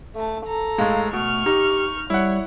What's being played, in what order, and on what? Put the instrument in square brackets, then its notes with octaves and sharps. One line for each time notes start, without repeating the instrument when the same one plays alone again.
[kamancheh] A3 A5
A4 A#5
[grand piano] A2 G#3 [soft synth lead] F5
[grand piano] B2 [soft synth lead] A3 [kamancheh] C#6 F6
[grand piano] D#4 [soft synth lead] G4
[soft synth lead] G3 [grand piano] E4 F#5 [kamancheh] C#5